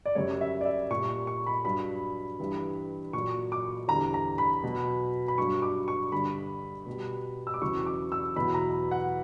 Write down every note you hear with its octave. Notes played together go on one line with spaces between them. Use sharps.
D5
F#2 C#3 G3 C#5
E5
D5
E5
A#2 G3 C#6
C#6
C#6
B5
G2 F#3 B5
G2 E3 G3
A#2 F#3 C#6
D6
E2 D3 G3 A#5
A#5
B5
B2 F#3
B5
G2 F#3 C#6
D6
C#6
G2 D3 G3 B5
B2 G3
E6
D6
E2 C#3 F#3 C#6
D6
E6
E2 B2 F#3 B5
A#5
F#5